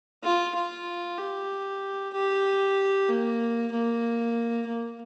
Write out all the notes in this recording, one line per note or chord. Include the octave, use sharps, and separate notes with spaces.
F4
F4
G4
G4
A#3
A#3
A#3